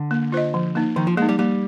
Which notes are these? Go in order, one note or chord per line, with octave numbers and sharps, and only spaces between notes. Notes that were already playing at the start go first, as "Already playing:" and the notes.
Already playing: D3
A#3
F4 C5 D#5
F3
A#3 D#4
D#3 F3
F3
G#3 A#3 D#4
G3
G3 A#3